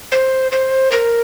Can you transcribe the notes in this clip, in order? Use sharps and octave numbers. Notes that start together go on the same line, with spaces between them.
C5
C5
A#4